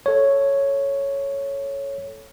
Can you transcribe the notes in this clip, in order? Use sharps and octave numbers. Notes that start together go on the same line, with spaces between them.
A4 C#5